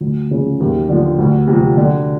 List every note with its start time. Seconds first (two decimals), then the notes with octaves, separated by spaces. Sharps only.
0.01 D2
0.31 C#3 F3
0.60 D#2
0.89 D3 F3
1.19 D2
1.47 C3 F3
1.77 D3